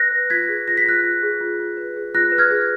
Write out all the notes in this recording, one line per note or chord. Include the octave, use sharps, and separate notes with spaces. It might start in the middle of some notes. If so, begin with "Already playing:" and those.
Already playing: B4 F#6 A#6
B4
F4 G#6 B6
G#4
F4 A#6
B6
F4 F#6 A#6
F4
G#4
F4
F4
B4
G#4
F4 F#6 A#6
B4
F6 G#6
G#4